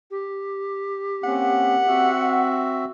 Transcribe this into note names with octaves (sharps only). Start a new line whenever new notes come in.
G4
A#3 C4 C#4 F#5
C4 F#4 E5